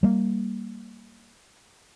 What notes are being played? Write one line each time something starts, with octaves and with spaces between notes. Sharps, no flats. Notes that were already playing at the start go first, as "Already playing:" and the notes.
G3 A#3